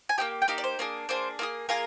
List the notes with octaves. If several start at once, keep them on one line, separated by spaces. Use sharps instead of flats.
G#5
A#3 D#4 G4 G5
G5
A#3 D#4 G4 F5
D5
C5
A#3 D4 G#4
A#3 D4 G#4 C5
A#3 F4 G#4
A#3 F4 G#4 A#4